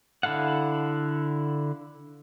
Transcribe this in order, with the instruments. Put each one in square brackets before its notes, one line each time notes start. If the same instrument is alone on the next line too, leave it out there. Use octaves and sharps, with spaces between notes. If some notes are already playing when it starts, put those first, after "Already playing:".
[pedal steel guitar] D3 E4 A4 F5 F#5